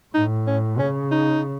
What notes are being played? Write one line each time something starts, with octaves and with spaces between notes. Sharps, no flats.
A2 D#4
C#4
C#3 C#4
D#4